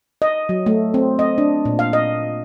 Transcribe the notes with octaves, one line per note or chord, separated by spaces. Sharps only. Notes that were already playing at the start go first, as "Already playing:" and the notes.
D#5
F#3
A3
C4
D#5
D4
A#2
F5
D#5